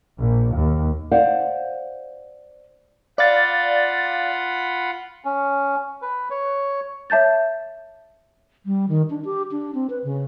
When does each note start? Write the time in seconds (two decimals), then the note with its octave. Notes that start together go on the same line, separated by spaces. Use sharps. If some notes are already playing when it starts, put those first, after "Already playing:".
0.20 A#1
0.54 D#2
1.11 C5 D5 F5 F#5
3.18 F4 D5 F5 F#5 B5 A6
5.25 C#4
6.02 B4
6.30 C#5
7.10 C#5 E5 A5 G6 A6
8.66 G3
8.89 D#3
9.10 D4
9.25 G4
9.51 D4
9.75 C4
9.90 B4
10.04 C#3